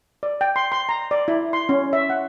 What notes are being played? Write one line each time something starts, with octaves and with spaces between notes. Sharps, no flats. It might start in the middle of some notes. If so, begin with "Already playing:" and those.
D5
G5
C6
C6
A#5
D5
E4
C6
C#4
E5
F#5